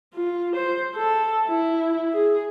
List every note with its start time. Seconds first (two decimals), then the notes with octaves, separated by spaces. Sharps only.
0.14 F4
0.56 C5
0.95 A4
1.47 E4
2.13 G#4